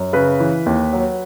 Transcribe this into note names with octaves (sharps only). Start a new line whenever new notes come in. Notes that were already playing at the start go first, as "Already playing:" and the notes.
Already playing: F#2
C#3 B4
E3
D#2
F#3